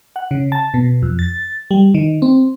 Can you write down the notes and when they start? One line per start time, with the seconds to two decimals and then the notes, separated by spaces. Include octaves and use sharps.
0.16 F#5
0.31 C#3
0.52 A5
0.74 B2
1.02 F2
1.19 A6
1.71 G3
1.94 D#3
2.22 C4